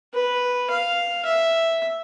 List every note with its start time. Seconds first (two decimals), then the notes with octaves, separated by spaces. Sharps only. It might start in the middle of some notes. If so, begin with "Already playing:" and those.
0.14 B4
0.70 F5
1.25 E5